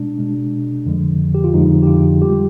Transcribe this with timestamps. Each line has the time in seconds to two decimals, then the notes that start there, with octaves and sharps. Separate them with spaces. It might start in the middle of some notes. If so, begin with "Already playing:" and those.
Already playing: B2 G#3 D4
0.18 B2 G#3
0.86 F2 D3 F3 G#3
1.35 G4
1.44 F4
1.54 F2 D3 F3 G#3 D#4
1.83 G4
1.87 F4
2.21 G3 G4